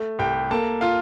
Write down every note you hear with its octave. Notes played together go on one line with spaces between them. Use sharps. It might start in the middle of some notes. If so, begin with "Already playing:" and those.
Already playing: A3
C2 G4 G5
A#3 A4 A5
F4 F5